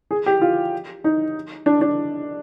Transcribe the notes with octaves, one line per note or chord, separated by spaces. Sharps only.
G#4
G4
F4
D#4
D4
D4